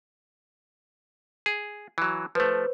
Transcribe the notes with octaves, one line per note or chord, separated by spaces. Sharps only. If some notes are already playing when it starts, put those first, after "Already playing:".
G#4
E3 F#3
F3 A3 B4 C5